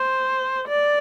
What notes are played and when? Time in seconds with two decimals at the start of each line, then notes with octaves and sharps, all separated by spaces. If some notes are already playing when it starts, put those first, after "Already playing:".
Already playing: C5
0.69 D5